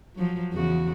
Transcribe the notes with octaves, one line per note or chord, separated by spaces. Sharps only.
F3 F#3
E2 C#3 F#4